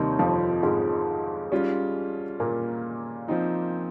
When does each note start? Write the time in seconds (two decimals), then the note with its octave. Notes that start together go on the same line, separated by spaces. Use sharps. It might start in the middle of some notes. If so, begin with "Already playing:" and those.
Already playing: D#2 C3 D#3 G3 C4 D#4
0.19 F2 F3
0.63 G#2 G#3
1.52 G3 C#4 F4
2.40 A#2 A#3
3.28 F3 C4 D#4